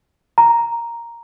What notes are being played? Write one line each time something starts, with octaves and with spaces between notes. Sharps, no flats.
A#5